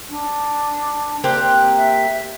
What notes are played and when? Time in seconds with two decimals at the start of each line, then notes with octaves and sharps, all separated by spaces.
0.10 D4
1.24 A#3 C4 G4 F#6
1.77 E5